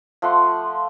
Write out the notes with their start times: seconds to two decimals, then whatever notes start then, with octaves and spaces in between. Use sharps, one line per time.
0.22 F3 A3 F#5 C6